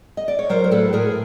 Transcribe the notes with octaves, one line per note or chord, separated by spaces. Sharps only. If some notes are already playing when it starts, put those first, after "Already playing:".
D#5
D5
C#5
F#3 A#4 C5
A#4
A2 A4 B4
A2 G#4 A#4